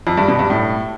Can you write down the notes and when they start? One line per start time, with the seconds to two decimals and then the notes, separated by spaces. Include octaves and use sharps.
0.07 F2
0.17 G2
0.28 B2
0.39 G2
0.50 A2